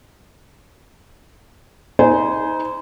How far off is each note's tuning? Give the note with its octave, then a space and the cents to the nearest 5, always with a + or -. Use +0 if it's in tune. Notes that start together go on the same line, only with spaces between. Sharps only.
D#4 +30 C5 -25 G#5 +0